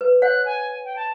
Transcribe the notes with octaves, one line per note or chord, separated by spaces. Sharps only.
B4
C#5 F#5 F#6
G#5
G5
A5